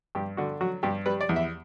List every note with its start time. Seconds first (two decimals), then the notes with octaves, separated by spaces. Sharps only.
0.15 G2 G4
0.37 D3 F#4
0.61 F#3 F#4
0.83 G2 G4
1.06 G3 B4
1.21 D5
1.29 E2
1.36 E5